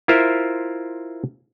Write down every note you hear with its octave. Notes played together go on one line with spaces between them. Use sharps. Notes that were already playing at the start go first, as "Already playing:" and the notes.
E4 F4 A#4 C5 E5